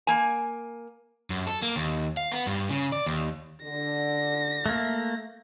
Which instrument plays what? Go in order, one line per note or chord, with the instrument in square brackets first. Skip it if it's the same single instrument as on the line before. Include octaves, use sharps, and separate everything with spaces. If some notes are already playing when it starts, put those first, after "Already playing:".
[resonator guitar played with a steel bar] A#3 G#5
[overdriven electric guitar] F#2
A4
A#3
D#2
F5
B3
G2
C#3
D5
D#2
[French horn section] D3 [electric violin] A#6
[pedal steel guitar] A3 A#3